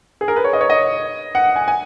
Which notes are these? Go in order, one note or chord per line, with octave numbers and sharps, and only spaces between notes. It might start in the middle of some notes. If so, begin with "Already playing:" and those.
G#4
A#4
B4
C#5
D#5
C#5
D#5
F#5
G#5
G#5